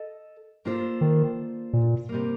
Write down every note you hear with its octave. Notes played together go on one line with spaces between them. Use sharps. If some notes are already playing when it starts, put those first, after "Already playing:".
Already playing: A4 D#5
A#3 D4 F4 A4 C5
D#3
A#2
C3 G3 A#3